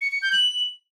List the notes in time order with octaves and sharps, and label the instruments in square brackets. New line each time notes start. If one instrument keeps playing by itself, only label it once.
[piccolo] C#7
C#7
G6
F#7